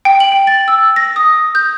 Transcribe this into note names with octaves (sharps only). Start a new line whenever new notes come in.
G5
F#7
G5
A6
E6
A#6
D#6
G6